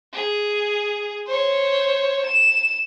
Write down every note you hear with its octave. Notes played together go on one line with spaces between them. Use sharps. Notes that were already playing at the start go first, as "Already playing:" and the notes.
G#4
C5 C#5
E7